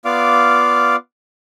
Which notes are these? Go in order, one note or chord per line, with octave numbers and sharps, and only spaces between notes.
B3 F4 D5 F5 D6